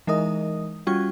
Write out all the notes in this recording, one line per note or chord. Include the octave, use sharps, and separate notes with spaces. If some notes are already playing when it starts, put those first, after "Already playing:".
E3 G#3 D#4 A#4 D#5 D#6
G3 C#4 F4 F#4 C#6 G#6